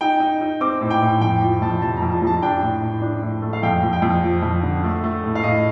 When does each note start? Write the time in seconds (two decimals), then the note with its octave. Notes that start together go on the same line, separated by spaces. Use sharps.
0.01 D#4 G5
0.20 D#4
0.41 D#4
0.61 C4 D6
0.81 A2
0.90 G5
1.01 A2
1.21 F2 G5
1.42 F3
1.62 F2 A5
1.82 C3 A5
1.97 A#5
2.02 F2
2.11 A5
2.22 F2 A5
2.42 D4 G5
2.62 A2
2.82 A2
3.02 D4
3.22 A2
3.42 A3
3.53 F5
3.63 F2 G5
3.83 F2
3.93 G5
4.02 F2
4.23 F3
4.43 F2
4.63 D3
4.84 A3
5.04 A3
5.24 A2
5.35 F5
5.43 A2 D#5